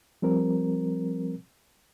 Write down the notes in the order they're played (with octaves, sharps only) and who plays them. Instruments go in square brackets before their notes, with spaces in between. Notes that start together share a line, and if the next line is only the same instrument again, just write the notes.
[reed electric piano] F3 G3 C4 A#4